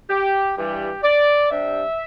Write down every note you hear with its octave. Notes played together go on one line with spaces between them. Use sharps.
G4
G2 E3 G3 G4
D5
C3 G3 D4 E5